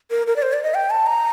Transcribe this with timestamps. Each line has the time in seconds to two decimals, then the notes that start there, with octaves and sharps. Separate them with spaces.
0.10 A#4
0.27 A#4
0.36 D5
0.42 C5
0.53 D5
0.63 D#5
0.74 G5
0.90 A5
1.06 A#5